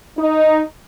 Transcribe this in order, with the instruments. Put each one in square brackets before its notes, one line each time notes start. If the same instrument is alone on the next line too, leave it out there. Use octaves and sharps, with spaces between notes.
[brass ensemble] D#4